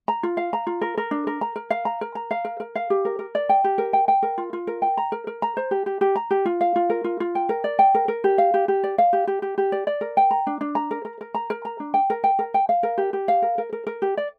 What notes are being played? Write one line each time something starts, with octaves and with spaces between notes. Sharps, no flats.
A#5
F4
F5
A#5
F4
A#4
A#4
D4
A#4
A#5
A#4
F5
A#5
A#4
A#5
F5
A#4
A#4
F5
G4
A#4
A#4
D5
G5
G4
A#4
G5
G5
A#4
F4
F4
A#4
G5
A#5
A#4
A#4
A#5
C5
G4
G4
G4
A#5
G4
F4
F5
F4
A#4
F4
F4
G5
A#4
D5
G5
A#4
A#4
G4
F5
G4
G4
D5
F5
G4
G4
G4
G4
D5
D5
A#4
G5
A#5
D4
D4
A#5
A#4
A#4
A#4
A#5
A#4
A#5
D4
G5
A#4
G5
A#4
G5
F5
A#4
G4
G4
F5
A#4
A#4
A#4
A#4
G4
D5